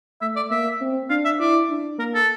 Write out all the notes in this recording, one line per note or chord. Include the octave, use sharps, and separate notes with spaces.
A3 E5
D5
A#3 E5
C4
D4 F5
E5
E4 D5
D4
A#3 A#4
A4